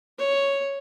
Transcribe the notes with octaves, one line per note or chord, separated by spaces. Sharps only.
C#5